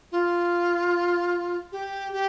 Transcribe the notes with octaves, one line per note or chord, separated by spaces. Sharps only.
F4
G4
G4